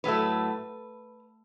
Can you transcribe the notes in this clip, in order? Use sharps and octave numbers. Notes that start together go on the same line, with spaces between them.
A2 F#3 A3 B4